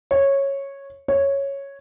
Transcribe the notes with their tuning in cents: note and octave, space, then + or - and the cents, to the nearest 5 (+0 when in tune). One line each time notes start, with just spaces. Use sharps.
C#5 -10
C#5 -5